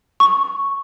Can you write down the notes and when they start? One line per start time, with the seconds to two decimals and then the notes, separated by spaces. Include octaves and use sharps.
0.20 C#6